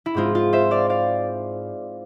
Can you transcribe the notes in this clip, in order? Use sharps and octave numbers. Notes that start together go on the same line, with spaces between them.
E4
G#2 G#3 C4 F4
F4
C5 E5
D5 F5
D5 F5